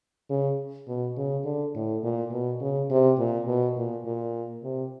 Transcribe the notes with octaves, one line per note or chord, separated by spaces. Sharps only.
C#3
B2
C#3
D3
A2
A#2
B2
C#3
C3
A#2
B2
A#2
A#2
C3